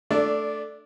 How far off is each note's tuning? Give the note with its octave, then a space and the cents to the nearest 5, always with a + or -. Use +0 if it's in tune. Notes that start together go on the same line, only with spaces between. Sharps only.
A3 +0 D4 +0 D5 -20